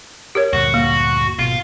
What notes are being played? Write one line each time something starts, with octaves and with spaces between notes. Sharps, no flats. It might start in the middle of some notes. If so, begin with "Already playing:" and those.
G4 A#4 C#5
D2 G2 A#2 F#4
A#3
G#1 B2 F4